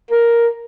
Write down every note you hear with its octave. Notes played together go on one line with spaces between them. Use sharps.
A#4